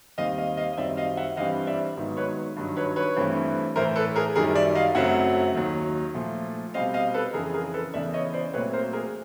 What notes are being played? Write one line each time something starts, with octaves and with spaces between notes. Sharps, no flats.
D#2 D#3 G3 C4 D#5 F5
D#5 F5
D#5 F5
D#5
F#2 D#3 G3 C4 D5 E5
D#5 F5
E5 F#5
G2 E3 G3 C4 D#5 F5
D5 E5
G#2 D#3 F#3 B3
B4 C#5
G2 D#3 F#3
B4 C#5
B4 C#5
G2 E3 A3 C4
A2 E3 A3 A#4 C5
A4 B4
G#4 A#4
F#2 D#3 G3 G#4 A#4
D5 E5
D#5 F5
F#2 C#3 F#3 A3 C4 E5 F#5
D#2 D#3 F#3
A#2 F3 A3
B2 G3 C4 D#5 F5
D#5 F5
A4 B4
F2 C#3 E3 G#4 A#4
G#4 A#4
A4 B4
E2 C#3 E3 D5 E5
C#5 D#5
C5 D5
A#2 F#3 A3 C4 B4 C#5
A#4 C5
G#4 A#4